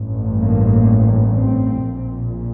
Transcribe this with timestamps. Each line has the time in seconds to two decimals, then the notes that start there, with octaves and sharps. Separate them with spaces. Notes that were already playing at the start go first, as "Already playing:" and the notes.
Already playing: A1 G2
0.38 A#3
1.34 C4
1.83 A#1 A#2